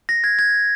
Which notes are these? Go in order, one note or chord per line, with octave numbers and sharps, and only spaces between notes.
A#6
G#6
G#6